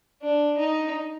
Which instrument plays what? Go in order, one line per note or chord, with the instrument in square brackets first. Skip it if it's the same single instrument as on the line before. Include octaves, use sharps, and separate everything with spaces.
[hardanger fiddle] D4
D#4